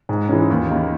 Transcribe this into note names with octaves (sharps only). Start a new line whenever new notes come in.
G#2
E3 G#3 C#4
D#2
D#3 A#3